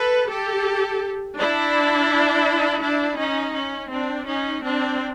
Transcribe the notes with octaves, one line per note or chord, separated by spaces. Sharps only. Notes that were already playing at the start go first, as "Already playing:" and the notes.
Already playing: A4 B4
G4 A4
D4 E4
D4 E4
C#4 D#4
C#4
C4 D4
C#4 D#4
C4 D4